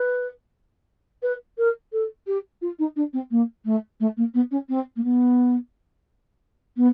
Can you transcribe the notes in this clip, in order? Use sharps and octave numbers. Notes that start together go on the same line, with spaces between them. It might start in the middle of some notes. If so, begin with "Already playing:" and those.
Already playing: B4
B4
A#4
A4
G4
F4
D#4
D4
C4
A#3
A3
A3
A#3
B3
C#4
C4
A#3
B3
B3